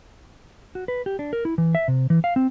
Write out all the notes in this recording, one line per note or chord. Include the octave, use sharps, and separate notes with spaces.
F#4
B4
G4
D4
A#4
E4
E3
E5
C3
E3
F5
C4